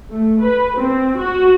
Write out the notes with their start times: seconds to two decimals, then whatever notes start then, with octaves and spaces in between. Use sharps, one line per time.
0.11 A3
0.41 B4
0.78 C4
1.17 F#4